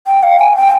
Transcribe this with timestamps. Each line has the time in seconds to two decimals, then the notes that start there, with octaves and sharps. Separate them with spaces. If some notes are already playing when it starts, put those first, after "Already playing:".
0.07 G5
0.23 F5
0.39 G#5
0.56 G5